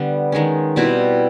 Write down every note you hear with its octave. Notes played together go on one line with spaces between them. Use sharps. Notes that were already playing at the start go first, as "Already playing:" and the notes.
Already playing: D3 G3 B3
D#3 G#3 C#4
B2 G3 C4 E4